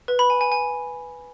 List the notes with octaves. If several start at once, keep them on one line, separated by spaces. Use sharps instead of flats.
B4
B5
G#5
G#5
G#5